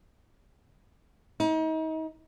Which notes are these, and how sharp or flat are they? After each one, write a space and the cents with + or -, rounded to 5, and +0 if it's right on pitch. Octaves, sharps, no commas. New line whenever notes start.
D#4 +35